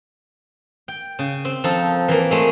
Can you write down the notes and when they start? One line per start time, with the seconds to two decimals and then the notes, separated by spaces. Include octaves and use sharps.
0.88 G5
1.19 C#3
1.45 C4
1.64 F3 D#4 A4
2.08 E3 A#3
2.30 F#3 G#3 A3